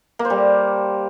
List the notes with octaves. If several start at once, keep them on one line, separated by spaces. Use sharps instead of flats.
A#3
C5
G3